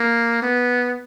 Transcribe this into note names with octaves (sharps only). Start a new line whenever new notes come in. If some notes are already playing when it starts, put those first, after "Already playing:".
Already playing: A#3
B3